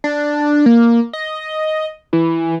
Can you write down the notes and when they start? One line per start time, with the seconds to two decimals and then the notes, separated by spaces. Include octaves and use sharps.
0.04 D4
0.66 A#3
1.13 D#5
2.13 E3